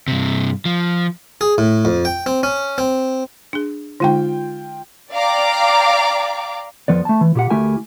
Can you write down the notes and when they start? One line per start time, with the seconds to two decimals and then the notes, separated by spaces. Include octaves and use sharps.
0.08 G2 C3
0.65 F3
1.41 G#4
1.58 A2
1.85 F2
2.05 G5
2.26 C4
2.43 C#4
2.78 C4
3.53 D4 G#4
4.00 D3 G#3 D#4 F4 G5
5.12 D5 F5 G5 A#5 D6
6.88 F2 F3 B3 D5
7.05 A3 A5
7.21 E3
7.35 A#2 G4 F#5
7.50 D2 A3 E4 G4 A#4 G#5